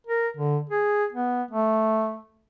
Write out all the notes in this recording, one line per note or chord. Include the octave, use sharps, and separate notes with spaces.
A#4
D3
G#4
B3
A3